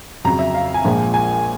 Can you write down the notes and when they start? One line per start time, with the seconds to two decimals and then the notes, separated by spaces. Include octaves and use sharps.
0.25 F2 C#3 F#3 A#5
0.39 E5
0.54 F5
0.74 G#5
0.85 A#1 A#2 F3 G#3
1.14 G#5